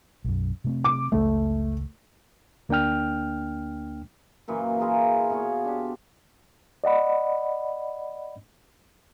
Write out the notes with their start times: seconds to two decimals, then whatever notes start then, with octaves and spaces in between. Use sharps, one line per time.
0.24 B1 F#2
0.64 C3 A3 C4
0.84 D6
1.12 F#1 C#2 A3
2.69 D2 A#3 D4 G5 F6
4.48 F#2 A#2 E3
4.80 E4 F4 G#4 A#4
5.30 B2 F4 C#5
5.64 D4 G4
6.84 D5 D#5 F#5 B5